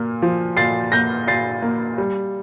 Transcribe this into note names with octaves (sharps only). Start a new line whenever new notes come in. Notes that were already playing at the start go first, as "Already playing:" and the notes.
Already playing: A#2 A#3
F3
A#2 A6 C7
A#3 G6 A#6
A#2 A6 C7
A#3
G3